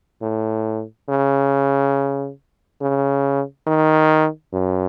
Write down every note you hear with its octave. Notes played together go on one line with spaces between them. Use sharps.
A2
C#3
C#3
D#3
F#2